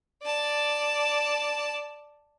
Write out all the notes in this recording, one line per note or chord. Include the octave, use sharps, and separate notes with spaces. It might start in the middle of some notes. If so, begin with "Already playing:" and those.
D5 A5